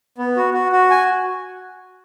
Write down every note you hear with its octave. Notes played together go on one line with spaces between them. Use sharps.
B3
F#4
F#4
F#4
G#5